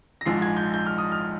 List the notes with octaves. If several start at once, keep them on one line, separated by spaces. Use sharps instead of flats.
A#6
A#1 G#2 F3 G#3 C7
G#6
G6
G6
F6
D#6
F6